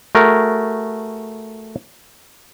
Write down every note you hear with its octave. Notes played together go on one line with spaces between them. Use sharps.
A3 F#4 G#4 A#4